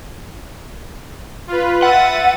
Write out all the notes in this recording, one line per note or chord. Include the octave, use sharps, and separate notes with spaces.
F4 B4
E5 F#5 A6 D#7